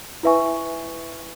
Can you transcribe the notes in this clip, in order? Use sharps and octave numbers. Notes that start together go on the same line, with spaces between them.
E4 B4 E5 G#5 C#6